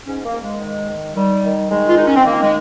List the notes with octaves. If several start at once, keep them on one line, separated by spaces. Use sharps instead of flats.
G#2 C#4
A#3
G#2
G#3
D#3
D#3
D#3 G3
D#3
D#3 G#3
F4
D#3 D#4
C#4
C4
D#3 A#3
G#3